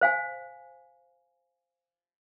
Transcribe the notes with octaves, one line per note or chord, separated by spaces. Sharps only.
C5 F5 G#5